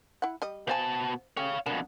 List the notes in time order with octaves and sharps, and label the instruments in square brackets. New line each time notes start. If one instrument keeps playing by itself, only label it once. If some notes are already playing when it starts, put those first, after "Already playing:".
[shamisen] E4 F#5
G3 D#5
[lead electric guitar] B2 A5 [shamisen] C5 F5 G#5
[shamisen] A3 C#4 G4 [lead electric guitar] C#5 F5
[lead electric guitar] F2 B2 [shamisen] D4 A#4